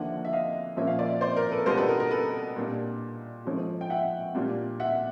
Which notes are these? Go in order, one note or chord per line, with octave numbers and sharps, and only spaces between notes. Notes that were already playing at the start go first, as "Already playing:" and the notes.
Already playing: D#2 D3 F3 A#3 D4 E5 F#5
E5
D#5 F5
A#2 F3 A#3 C#4 F4 E5
F5
D5 E5
C5 D5
A#4
A4 B4
B2 G3 B3 D4 F4 A#4 C5
A4 B4
A#4
A#4
A4 B4
A#2 G3 A#3 D4
G#2 F3 A3 C#4 F4
G5
E5 F#5
A#2 G3 A#3 D4 F4
E5 F#5